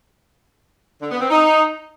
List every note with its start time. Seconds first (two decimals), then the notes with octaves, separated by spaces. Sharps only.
1.01 D3
1.11 B3
1.20 C4
1.30 D#4